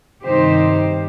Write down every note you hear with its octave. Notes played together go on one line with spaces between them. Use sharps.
G2 C3 D#3 D#4 G4 C5